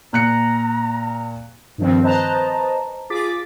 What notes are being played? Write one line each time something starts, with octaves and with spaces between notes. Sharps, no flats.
A#2 A#5 F#6 C#7
G2 D#3 F3 G3 C4
B4 C5 D#5 A5 A#5
F4 G#4 D6 A6 B6